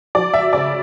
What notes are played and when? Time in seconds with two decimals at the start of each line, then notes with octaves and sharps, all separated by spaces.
0.15 F#3 D5
0.34 E5
0.53 C#3 D5